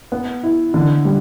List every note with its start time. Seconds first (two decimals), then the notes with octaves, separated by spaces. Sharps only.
0.12 B3
0.43 E4
0.74 D3
1.05 G3